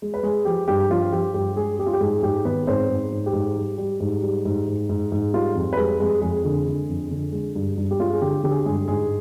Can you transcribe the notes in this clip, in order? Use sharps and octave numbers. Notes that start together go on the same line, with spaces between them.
G#3
B4
G#3 G#4
F3 G4
G2 G4
F3 F4
F3 G4
G2 G4
G#3 G#4
G3 G4
F4
G4
G#2 G#3 G#4
G#4
G#2 G4
D#3 B3 B4
G#2 C4 C5
G#2
G#2
G4
G#2
G3
G3
G#2
G3
G#2
G#2
G#2
G#2
G3 F4
F2
B4
G3 G#3 G#4
F2 G#3 G#4
F2 G#3 G#4
D3
D3
F2
D3
G#3
G2
G2
G4
G#3 F4
G#4
D3 G4
D3 G4
G#4
G4
G2 G#3 G#4
G#2 G#3 G#4